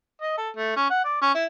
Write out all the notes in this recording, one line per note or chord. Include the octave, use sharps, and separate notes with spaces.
D#5
A4
A3
C#4
F#5
D5
C#4
E4